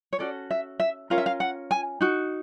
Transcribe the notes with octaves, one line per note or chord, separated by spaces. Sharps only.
C#5
C#4 F#4 A4 D5
E5
E5
C#4 F4 A#4 F5
E5
F5
F#5
G#5
D#4 F#4